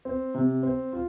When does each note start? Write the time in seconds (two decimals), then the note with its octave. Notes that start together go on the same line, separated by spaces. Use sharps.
0.05 C4
0.35 C3
0.63 C4
0.93 F4